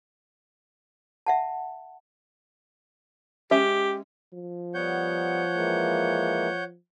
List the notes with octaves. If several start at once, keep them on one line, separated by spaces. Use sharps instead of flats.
E5 F#5 A5
G#3 C#4 G4 E5
F3
G3 B3 C#5 F#5 G6
E3 G#3 A#3